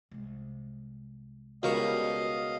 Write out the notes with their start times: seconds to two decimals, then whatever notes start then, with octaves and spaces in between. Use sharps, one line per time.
0.11 C2 G#3
1.63 C#2 B2 G3 A#4 D#5 F5 C#6